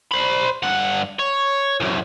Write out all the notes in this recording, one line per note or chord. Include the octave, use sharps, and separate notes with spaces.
C5 B5
G2 F#5
C#5
C2 F#2